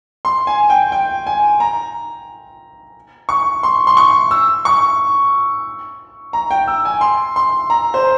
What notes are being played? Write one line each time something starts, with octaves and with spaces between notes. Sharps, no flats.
C6
G#5
G5
G5
G#5
A#5
C#6
C6
C6
C#6
E6
C#6
A#5
G5
E6
G#5
C6
C6
A#5
C5